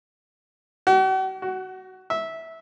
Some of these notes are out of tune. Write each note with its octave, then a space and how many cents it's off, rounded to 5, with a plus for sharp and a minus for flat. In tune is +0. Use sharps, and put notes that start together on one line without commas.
F#4 +45
F#4 +15
E5 -15